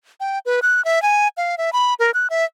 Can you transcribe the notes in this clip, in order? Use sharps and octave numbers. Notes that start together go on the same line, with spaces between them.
G5
B4
F#6
E5
G#5
F5
E5
B5
A#4
F#6
E5